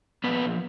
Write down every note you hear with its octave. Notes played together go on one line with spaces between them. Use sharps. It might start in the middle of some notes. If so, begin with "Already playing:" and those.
A#2 F3 B3 B4